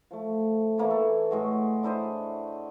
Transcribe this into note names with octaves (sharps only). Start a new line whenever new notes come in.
F3 A3
E3 A#3 E4 C#5
A4
A2 G#3 F#4
D4 E4 C5 D#5